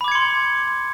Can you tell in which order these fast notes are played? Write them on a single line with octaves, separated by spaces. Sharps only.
B5 D6 G#6 C#7 C6